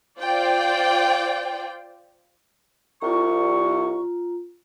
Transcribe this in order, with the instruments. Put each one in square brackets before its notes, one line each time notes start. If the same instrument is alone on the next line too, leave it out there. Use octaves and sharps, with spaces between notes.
[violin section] F4 C5 D5 G5
[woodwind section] C2 C#6 [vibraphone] F4 A#5